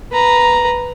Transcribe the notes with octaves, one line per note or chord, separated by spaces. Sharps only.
B4 A#5